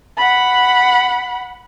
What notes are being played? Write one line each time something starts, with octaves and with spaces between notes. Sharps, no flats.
F#5 B5